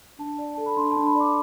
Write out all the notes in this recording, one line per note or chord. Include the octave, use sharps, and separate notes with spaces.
D4 A5
D5
A4 A5
B5
D4 C6
A5
D4
B5
D5 D6